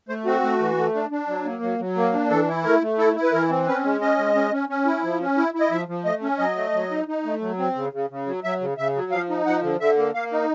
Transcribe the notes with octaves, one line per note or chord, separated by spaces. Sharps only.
A3 C5
C4 F#4
A3
E3
A3
D4
D4
F#3
A#3
F#3
F#3
A#3
D4
E3 A4
E4
A3 A#4
A3
E4 A4
E4
B4
E3 A#4
C4
C#4 B4
G#3
C#4 D#5
G#3
C#4
C#4
C#4
E4
F3
C#4
E4
E4
D#5
F3 E5
F3
A3 D#5
C#4
F#3 D#5
A3
F#3
D#4
D#4
A3
F#3
C4
C#3
C#3
C#3
F#3
F#3 E5
C#3
C#3 E5
F#3
F3 F5
D#4
F3 F#5
D3
D3 E5
A#3
A#3 F5
D#4